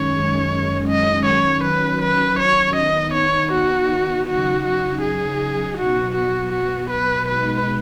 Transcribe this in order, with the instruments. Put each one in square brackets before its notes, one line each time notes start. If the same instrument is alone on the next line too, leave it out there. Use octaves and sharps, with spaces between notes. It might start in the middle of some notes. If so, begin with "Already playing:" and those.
Already playing: [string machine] F#2 D#3 G#3 C#4 [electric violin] C#5
[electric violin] D#5
[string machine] D#3 F#3 C#4 [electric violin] C#5
[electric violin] B4
B4
C#5
[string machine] D#3 B3 D#4 [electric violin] D#5
[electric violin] C#5
F#4
[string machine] C#3 F#3 D#4 [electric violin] F#4
[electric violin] F#4
G#4
[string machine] B2 F#3 B3 [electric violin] F#4
[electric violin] F#4
F#4
B4
[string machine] B2 G#3 B3 D#4 [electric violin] B4